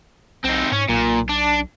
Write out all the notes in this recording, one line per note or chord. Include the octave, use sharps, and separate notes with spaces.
B1 C4 D#4
G#2 C#4
B1 A#2
D4